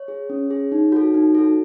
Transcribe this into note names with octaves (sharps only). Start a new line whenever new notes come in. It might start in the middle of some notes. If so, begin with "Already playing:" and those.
Already playing: C#5
G#4
C#4
G#4
D#4
F#4 A4
D#4
F#4 A4